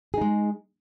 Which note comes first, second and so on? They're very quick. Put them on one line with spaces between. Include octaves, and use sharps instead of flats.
G#4 D#4 G#3